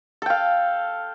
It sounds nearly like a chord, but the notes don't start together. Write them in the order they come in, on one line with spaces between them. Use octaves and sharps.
A4 G5 F5